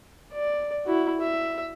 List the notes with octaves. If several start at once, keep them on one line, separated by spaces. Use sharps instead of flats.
D5
E4 F#4
E5